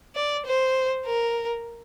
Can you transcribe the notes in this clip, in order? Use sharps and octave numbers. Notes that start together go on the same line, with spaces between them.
D5
C5
A#4